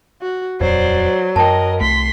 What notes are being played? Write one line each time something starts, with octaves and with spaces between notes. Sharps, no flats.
F#4
D#1 G#1 F2 F#3 C5 D5
F#2 A#4 D#5 G5 A5
C2 A3 C6 B6